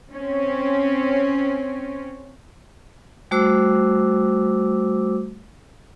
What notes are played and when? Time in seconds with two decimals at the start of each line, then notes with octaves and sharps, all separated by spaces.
0.13 C4 C#4
3.31 G3 A3 F#4 C5 D6 E6